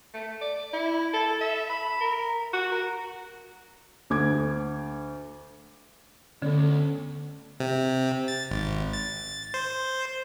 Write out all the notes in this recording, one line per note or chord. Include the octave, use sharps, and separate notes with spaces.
A3
D5
E4
A4
E5
B5
A#4
F#4
A#4
D2 D6 G#6
D2 D3 B3 C#4 A4
C3
A6
G#1
A6
C5